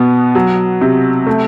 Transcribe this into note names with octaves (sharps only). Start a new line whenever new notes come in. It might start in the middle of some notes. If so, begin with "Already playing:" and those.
Already playing: B2 B3
F#3
C3
A3